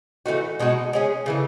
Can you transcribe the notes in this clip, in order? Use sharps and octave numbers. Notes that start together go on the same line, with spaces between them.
E3 A3 D#4 F#4
B2 G#3 D#4 F#4
G#3 C#4 G#4
C#3 E3 A3